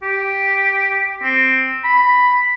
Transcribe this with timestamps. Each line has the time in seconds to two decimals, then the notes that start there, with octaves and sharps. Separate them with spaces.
0.03 G4
1.23 C4
1.84 B5